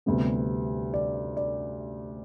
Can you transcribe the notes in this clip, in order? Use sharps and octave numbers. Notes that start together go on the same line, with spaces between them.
D2 C3 G3 B3
D5
D5